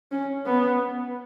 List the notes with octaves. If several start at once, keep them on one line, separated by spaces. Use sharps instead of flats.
C#4
B3